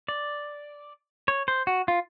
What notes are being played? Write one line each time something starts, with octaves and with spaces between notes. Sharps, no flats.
D5
C#5
C5
F#4
F4